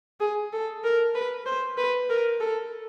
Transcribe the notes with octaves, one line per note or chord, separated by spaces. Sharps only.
G#4
A4
A#4
B4
C5
B4
A#4
A4